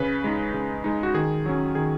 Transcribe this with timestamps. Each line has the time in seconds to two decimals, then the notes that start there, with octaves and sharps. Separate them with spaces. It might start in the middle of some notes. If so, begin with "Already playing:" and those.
Already playing: C#3 B4
0.24 G#3 D#4
0.54 C#3
0.84 G#3 D#4
1.03 F#4
1.14 D#3 G#4
1.46 F#3 C#4
1.75 D#3 G#4